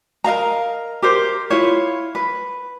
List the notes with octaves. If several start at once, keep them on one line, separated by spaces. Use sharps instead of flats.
A#4 D#5 F5 A#5
G4 A#4 C5
E4 F4 C#5
B4